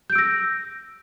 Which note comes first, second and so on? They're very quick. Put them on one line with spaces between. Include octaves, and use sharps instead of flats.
G6 D7 E6 A#6